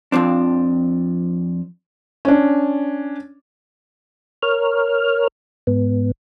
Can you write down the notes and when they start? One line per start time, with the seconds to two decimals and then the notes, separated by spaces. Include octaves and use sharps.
0.12 F2 F3 C4 D4
2.25 C#4 D4
4.43 A#4 C#5 F6
5.67 G#2 B3